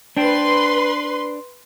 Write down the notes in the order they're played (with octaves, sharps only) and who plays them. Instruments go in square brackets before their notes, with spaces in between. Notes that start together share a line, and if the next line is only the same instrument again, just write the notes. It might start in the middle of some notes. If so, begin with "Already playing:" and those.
[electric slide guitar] D4 C5 G5 [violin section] B4 C6